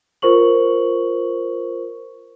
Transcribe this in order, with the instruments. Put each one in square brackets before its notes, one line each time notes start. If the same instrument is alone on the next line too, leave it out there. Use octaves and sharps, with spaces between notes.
[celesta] F4 A#4 C5 C#6 F#7